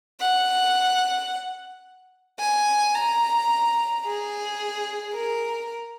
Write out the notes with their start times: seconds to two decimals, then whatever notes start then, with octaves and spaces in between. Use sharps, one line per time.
0.21 F#5
2.40 G#5
2.95 A#5
4.05 G#4
5.14 A#4